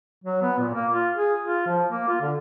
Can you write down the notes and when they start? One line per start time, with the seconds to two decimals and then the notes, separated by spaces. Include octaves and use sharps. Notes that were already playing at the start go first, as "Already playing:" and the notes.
0.24 F#3
0.42 B3
0.59 A#2
0.74 A#3
0.91 F4
1.16 G#4
1.44 F4
1.67 F3
1.91 A#3
2.08 F4
2.21 D3